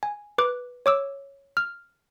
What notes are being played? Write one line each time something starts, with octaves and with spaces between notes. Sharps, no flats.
G#5
B4 D6 F#6
C#5 D6 E6
F6